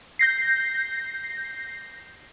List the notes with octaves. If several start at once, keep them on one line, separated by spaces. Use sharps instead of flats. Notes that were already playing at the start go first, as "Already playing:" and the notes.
G6 A#6 C7